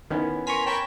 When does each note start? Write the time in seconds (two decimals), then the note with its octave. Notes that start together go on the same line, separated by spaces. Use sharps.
0.10 D#3 B3 C#4 E4
0.47 A#4 G#5 A#5 C6 C#6 B6
0.66 A#4 C#5 G5 A5 B5